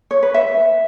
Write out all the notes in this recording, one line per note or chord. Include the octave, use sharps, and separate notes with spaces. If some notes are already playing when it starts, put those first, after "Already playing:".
C#5
B4
E5